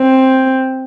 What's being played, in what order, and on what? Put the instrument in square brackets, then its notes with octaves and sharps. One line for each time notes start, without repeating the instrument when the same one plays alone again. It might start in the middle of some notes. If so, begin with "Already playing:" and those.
Already playing: [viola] C4